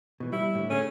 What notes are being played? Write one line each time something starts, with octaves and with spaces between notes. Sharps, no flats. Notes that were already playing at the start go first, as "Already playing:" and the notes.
B2 E3
G3 E4
A2 D3
A3 C#4 G#4